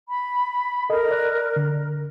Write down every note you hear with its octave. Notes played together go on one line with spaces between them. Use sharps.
B5
A4 A#4 D#5
D5 F#6
D3